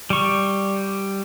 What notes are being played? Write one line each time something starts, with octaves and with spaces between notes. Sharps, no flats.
G3 C#6